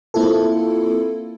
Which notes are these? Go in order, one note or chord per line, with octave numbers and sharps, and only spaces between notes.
A#3 C4 E4 F4 A4